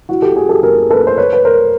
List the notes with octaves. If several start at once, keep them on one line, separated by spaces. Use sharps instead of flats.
E4 F#4
G4 A4
F#4 G#4
G4 A4
G#4 A#4
A4 B4
C5
B4 C#5
B4
A#4 C5